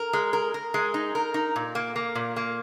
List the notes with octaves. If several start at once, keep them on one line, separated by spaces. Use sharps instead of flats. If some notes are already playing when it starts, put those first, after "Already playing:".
Already playing: A#4
G#3
A#4
A#4
G#3
D#4
A#4
D#4
A#2
A#3
A#3
A#2
A#3